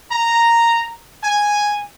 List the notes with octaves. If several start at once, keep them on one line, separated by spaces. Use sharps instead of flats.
A#5
G#5